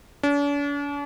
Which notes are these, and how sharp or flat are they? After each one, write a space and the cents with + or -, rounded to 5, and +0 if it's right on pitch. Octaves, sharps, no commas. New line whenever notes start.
D4 -45